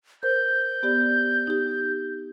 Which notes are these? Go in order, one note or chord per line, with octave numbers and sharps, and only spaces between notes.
A#4 C5 G6
B3 G4 D5
D#4 G4